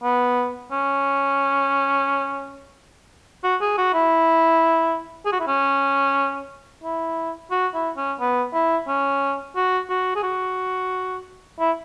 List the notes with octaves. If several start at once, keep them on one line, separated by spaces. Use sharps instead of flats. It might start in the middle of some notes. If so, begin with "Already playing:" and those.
B3
C#4
F#4
G#4
F#4
E4
G#4
F#4
E4
C#4
E4
F#4
E4
C#4
B3
E4
C#4
F#4
F#4
G#4
F#4
E4